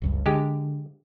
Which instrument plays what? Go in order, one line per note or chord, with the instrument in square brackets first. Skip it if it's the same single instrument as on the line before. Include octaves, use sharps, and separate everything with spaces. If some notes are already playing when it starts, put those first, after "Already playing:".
[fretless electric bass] F#1 C#2 G2
[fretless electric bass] D3 [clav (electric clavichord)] G#3 G4